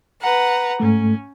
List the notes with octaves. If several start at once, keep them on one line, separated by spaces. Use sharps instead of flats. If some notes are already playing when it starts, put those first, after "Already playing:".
B4 F#5 A#5
G#2 A3 C#4